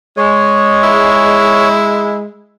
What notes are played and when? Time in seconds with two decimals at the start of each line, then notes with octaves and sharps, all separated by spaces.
0.17 G#3 C#5
0.83 E4